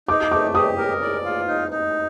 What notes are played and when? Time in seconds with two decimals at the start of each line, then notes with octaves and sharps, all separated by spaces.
0.08 D#4 D6
0.31 A3 D6
0.55 G4 D#6
0.78 A#4
1.02 D5
1.25 F4
1.48 D#4
1.71 D#4